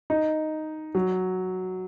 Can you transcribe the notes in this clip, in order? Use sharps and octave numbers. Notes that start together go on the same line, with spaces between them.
D#4
F#3